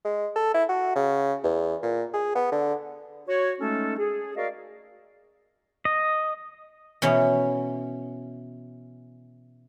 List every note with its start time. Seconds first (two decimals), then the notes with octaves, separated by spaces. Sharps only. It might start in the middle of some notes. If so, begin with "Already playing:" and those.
0.05 G#3
0.36 A4
0.54 E4
0.69 F#4
0.96 C#3
1.44 E2
1.82 A#2
2.14 G#4
2.35 B3
2.52 D3
3.27 F#4 C#5
3.60 G#3 A3 C#4 D#4 A4
3.98 G#4
4.36 F#4 A#4 D5 D#5 F5
5.85 D#5
7.02 B2 E3 C#4